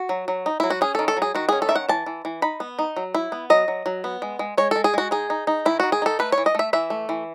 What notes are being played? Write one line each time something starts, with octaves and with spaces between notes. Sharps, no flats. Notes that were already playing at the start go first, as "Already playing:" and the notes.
Already playing: F#4
F#3
F#3
D#4
F#3 E4
F#4
C#4 G#4
D#3 A4
A4
F#3
G#4
D#3 F#4
C#4 G#4
A4
D#3 E5
F#5
E3 A5
E3
E3
D#4 B5
B3
D#4
F#3
E4
B3
F#3 D#5
F#3
F#3
B3
G#3
G#3
G#3 C#5
G#3 A4
G#4
G#3 F#4
D#4 G#4
D#4
D#4
D#3 E4
D#3 F#4
G#4
D#4 A4
A3 B4
C#5
E3
D#5
A3 E5
E3 E5
A3
E3